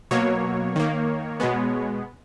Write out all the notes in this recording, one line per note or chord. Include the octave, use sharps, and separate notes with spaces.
B2 F#3 A#3 C#5
D#3 A#3
B2 G#3 B3